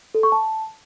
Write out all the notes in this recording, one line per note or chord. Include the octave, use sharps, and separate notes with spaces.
A4
C#6
A5